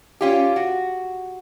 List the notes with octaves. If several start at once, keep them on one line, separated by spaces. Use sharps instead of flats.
C#4 F4 G4
F#4